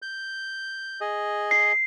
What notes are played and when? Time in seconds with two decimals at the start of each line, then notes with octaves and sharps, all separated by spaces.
0.02 G6
1.01 G#4 D#5
1.51 C7